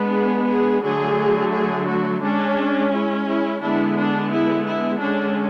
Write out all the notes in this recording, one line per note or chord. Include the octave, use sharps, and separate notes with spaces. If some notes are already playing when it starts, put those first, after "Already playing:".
Already playing: G#3 B3 D4
G#4
G#4
D3 F#3 A3 G#4
G#4
F#4
G#3 C#4 D4
E4
E4
D3 G#3 B3 D4 E4
D4
E4
E4
D3 G#3 C#4 D4